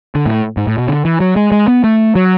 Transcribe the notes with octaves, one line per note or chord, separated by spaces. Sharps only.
D3
A2
G#2
A2
B2
D3
E3
F#3
G#3
G#3
B3
A3
F#3